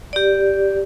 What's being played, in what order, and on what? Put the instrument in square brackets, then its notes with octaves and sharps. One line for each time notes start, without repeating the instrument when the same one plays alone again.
[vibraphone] G4 D5